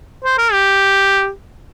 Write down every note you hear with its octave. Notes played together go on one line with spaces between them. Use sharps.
C5
A#4
G4